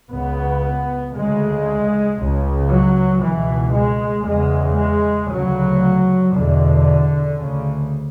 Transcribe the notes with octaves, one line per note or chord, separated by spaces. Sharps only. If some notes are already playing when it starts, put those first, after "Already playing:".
C#2 C#3 B3
D2 C#3 G#3
C#2 C#3
F#3
C#2 B2 E3
G#3
E2 C#3 G#3
G#3
D2 C#3 F#3
E2 B2 D3
D2 C#3